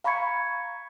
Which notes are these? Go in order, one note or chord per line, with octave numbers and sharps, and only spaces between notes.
F5 A#5 B5 C#6 G#6 C#7